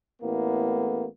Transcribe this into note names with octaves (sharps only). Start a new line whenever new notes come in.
A1 A2 A#3 B3